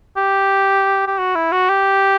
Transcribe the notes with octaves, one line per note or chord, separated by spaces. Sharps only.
G4
G4
F#4
E4
F#4
G4